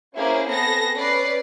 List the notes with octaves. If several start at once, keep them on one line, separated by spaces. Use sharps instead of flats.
A#3 C#4 E4 G#4 C5
B3 C4 G#4 A4 A#6
C#4 B4 D5 C7